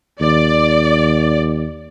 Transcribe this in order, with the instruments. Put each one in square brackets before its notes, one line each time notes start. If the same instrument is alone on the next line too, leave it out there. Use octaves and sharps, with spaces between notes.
[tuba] D#2 [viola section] D5